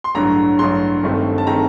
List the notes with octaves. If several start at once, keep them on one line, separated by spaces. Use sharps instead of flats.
C6
A1 G2 D3 F#3 A#5
A1 G2 D3 F#3 C6
G1 G2 D#3 A3 C4
A5
D#3 A3 C4 A#5